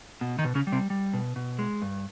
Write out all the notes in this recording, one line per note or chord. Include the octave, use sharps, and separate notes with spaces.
B2
D#3 D#4
B2
C#3 C#4
G3
C3 C4
G3
B2
B2
G#3
G2